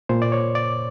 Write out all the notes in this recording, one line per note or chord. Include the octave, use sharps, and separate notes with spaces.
A#2 C5
D5
C#5
D5